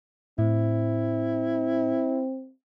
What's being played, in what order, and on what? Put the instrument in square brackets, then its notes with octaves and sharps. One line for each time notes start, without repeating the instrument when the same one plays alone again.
[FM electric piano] A2 [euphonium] C4 [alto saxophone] E4